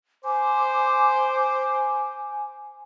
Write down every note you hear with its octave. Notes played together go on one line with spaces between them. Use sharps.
C5 G#5 D6